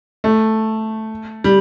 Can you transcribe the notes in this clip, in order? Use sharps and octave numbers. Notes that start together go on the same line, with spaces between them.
A3
G3